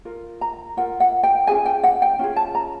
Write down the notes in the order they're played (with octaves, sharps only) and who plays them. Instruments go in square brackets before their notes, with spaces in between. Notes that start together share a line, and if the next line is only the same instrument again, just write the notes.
[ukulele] F4 A#4
A#5
F4 A#4 F#5
F#5
G5
C#4 F4 G#4 G#5
G5
F#5
G5
C#4 F4 G#4
A5
A#5